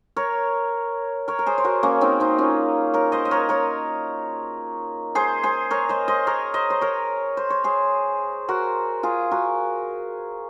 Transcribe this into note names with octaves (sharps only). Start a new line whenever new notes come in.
A#4 C#5
A#4 C#5
A#4
G#4 C5
C5
F#4 A#4
A#3 C#4
C4 D#4
C4 D#4
C#4 F4
A#4 C#5
C5 D#5
D#5
A#4 C#5
A#4 C#5
G#4 C5
G#4 C5
A#4 C#5
C5 D#5
C5 D#5
A#4 C#5
C5 D#5
C5
A#4 C#5
C5
C#5
G#4 C5
F#4 A#4
F4 G#4
F#4 A#4